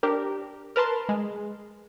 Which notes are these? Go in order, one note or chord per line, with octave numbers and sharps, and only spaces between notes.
D4 G4 A#4
A#4 B4 A5 C6
G#3